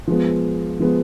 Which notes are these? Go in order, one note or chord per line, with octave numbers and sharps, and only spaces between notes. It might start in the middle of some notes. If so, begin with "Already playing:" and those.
F3 G#3 B3
F3 G#3 B3